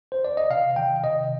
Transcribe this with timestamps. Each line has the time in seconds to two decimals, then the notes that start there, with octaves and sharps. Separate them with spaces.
0.12 C5
0.25 D5
0.37 D#5
0.50 C3 F5
0.76 D#3 G5
1.03 C3 D#5